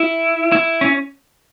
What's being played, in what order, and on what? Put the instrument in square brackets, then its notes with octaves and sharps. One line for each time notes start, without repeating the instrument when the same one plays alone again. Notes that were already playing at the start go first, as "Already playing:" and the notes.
Already playing: [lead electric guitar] E4
E4
C#4